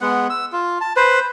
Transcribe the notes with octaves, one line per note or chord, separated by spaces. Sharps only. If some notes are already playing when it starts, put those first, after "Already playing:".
G#3 B3 F#5
E6
F4
A5
B4 C5